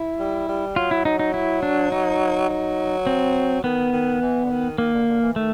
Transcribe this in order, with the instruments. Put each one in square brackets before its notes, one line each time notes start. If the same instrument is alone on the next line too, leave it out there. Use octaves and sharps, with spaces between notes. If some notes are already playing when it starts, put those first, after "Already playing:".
Already playing: [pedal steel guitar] E4
[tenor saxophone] G3
G3
[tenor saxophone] F#3 [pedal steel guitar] F4
[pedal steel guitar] E4
[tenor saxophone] F#3 [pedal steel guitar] D#4
[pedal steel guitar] D#4
E4
D4
D#4
[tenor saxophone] F#3
[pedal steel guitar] C4
[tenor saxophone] D#3 [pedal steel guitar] B3
[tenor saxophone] D#3
E3
D3
D#3
[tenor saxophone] D#3 [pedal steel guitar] A#3
[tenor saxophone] D3
D3
E3
[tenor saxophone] D#3 [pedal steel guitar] A3